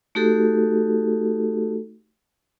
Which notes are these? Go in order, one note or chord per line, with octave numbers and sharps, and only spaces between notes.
A3 D#4 F#4 G4 A4